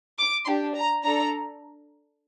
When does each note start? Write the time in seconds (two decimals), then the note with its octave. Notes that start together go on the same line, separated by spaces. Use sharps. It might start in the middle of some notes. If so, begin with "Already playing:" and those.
0.19 D6
0.47 D4 G4 C6
0.75 A#5
1.03 D4 A4 A#5